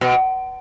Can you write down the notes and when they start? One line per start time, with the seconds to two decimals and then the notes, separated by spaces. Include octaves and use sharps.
0.01 B2